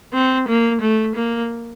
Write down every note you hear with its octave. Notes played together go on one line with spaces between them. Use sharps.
C4
A#3
A3
A#3